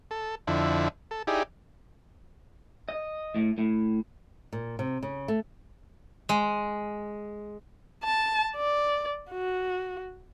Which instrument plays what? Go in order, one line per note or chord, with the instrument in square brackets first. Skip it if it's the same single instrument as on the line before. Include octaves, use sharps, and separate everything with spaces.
[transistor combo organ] A4
F2 D3 E4
A4
D#4 E4 G4 G#4 D5
[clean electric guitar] D#5
A2
A2
[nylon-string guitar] A#2
C3
C#3
A3
[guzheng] G#3
[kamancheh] A5
D5
F#4